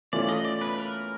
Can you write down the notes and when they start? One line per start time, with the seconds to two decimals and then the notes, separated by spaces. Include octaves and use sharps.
0.13 E3 A3 C#4 F4 D5
0.29 D#5
0.45 D5
0.61 B4
0.78 A#4